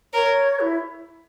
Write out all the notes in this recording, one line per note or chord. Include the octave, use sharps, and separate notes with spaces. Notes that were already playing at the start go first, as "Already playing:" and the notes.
A#4 C#5
E4